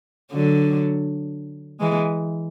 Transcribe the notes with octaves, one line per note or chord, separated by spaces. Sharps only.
D3 F#3
E3 G#3